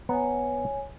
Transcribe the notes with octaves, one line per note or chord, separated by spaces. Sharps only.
B3 C#5 G#5 A#5